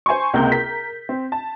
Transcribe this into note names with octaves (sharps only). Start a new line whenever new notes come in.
C5 G#5 C6 C#6
C#2 C3 A#3 G6
A#4 B6
C4
A5